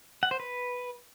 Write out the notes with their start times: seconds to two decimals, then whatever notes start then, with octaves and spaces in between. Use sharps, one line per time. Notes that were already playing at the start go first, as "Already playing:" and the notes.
0.23 F#5
0.31 C5
0.40 B4